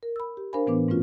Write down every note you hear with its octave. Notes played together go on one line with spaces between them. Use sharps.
A#4
B5 E6
G4
D4 A#4 C5 F5 G#5 B5
A2 E3 B3 D4 B4 D6
G#2 A3 C#4 F4 F#4